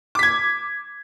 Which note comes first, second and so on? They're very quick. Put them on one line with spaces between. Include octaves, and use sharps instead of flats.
D6 B6 G#6